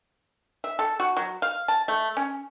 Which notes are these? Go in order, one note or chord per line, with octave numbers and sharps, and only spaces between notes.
E5
A4
F#4
F#3
F5
A5
A3
C#4